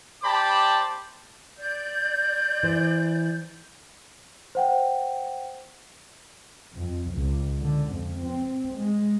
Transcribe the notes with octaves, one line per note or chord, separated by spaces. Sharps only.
G4 C5 D5 A5 B5 D6
D5 G6
E3 C5
C5 F#5 G5
F2
C#2
D3
F2
C4
G#3